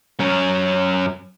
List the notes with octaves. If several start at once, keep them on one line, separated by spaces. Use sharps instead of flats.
F#2 C#4